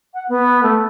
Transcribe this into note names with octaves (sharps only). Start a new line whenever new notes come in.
F#5
B3
A3